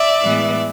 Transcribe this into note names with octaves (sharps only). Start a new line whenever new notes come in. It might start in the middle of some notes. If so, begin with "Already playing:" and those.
Already playing: D5 E5
A2 E3 G#3 B3